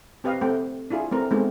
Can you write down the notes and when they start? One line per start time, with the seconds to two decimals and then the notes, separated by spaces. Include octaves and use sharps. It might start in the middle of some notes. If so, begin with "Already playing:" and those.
0.24 C4 G4 B4 D#5 F5
0.41 A3 C4 F#5 G5
0.90 D4 E4 F4 G#4
1.11 A3 C4 A#4 B4
1.31 G#3 A3 B3 C4 D#4 G#4